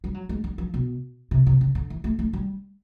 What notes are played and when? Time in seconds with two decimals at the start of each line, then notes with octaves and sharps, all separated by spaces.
0.04 G3
0.14 F#3
0.29 G#3
0.44 G3
0.58 F3
0.74 B2
1.31 C3
1.46 C3
1.61 C#3
1.75 D3
1.90 E3
2.04 A3
2.19 A3
2.33 G3